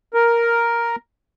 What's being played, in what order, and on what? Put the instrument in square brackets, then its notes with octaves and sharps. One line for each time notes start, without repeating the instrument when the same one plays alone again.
[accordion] A#4